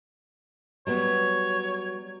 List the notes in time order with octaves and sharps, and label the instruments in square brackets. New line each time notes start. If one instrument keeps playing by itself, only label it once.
[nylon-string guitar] F#3 G3 B3 [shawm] C#5